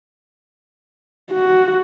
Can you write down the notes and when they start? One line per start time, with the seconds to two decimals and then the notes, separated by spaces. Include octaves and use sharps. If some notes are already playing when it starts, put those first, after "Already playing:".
1.31 F#4